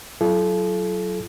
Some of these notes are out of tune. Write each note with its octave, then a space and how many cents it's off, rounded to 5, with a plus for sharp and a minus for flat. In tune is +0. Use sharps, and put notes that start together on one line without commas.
F#3 +0 F4 -40 A4 -35